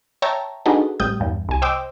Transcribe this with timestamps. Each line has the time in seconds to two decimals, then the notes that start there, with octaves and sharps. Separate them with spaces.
0.22 C#5 E5 G5 A5 A#5
0.66 D4 D#4 F#4 G#4 A4 B4
1.00 A1 G3 D#6 G6
1.20 E2 G2
1.49 C2 G#5
1.62 C5 D#5 G5 D6 E6